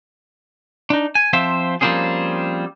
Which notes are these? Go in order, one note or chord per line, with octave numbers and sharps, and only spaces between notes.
D4 D#4
G#5
F3 C4 F4 C5 E5
F3 G3 A#3 C4 C#4 G#4